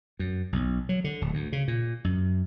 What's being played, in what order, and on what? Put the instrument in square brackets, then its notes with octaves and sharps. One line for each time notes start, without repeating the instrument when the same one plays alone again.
[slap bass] F#2
B1
F#3
D3
D1
D2
C#3
A#2
F#2